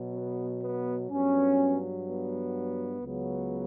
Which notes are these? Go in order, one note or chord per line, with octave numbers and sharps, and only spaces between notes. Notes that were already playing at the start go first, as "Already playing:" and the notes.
Already playing: B2 F#3
B3
B3
G2 F#3 B3 C#4
B3
C#2 C#3 F#3 B3